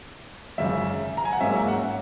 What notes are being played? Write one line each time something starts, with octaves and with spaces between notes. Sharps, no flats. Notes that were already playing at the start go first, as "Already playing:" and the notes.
G#1 F#2 C#3 E5
A#5
G#5
F#5
G#2 F#3 A#3 C#4 E5
F#5